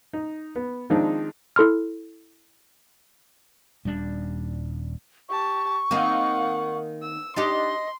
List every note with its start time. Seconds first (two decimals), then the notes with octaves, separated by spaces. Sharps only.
0.13 D#4
0.56 B3
0.90 D#3 F3 G#3 C4 D4 D#4
1.56 E4 A4 C6 F6
3.85 D#1 G3 D4
5.29 G4 A5 C#6
5.91 D#3 A#3 C4 F5 F#5
7.02 E6
7.36 D4 D#4 G4 D#5 C6